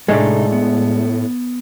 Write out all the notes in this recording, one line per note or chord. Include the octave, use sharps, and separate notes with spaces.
A2 C3 G#3 A3 D4 D#4 A4
B3